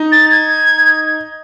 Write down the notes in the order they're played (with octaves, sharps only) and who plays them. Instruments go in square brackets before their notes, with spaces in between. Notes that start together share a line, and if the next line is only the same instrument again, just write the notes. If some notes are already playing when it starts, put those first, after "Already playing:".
Already playing: [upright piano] D#4
[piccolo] A6
G#6